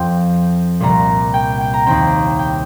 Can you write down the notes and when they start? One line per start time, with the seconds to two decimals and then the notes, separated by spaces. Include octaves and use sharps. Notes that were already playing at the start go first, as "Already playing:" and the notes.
Already playing: F2 F3 C4 G5
0.80 C2 A#2 G3 A#5
1.34 G5
1.61 G5
1.74 A#5
1.86 D#2 D#3 C4 G5
2.39 G5